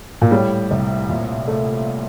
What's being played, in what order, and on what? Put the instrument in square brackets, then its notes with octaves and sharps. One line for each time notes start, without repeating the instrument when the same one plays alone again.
[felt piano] A#2
[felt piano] A2 [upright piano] G3
[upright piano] C2
A#2
A3